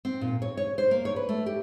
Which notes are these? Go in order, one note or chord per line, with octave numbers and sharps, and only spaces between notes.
C4
A#2
C#5
C#5
C5
A#3
C#5
B4
A3
G4